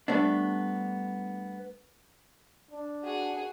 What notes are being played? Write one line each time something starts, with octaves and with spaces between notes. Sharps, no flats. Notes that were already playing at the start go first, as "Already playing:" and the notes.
G3 A3 B3 D4
D4
F#4 G#4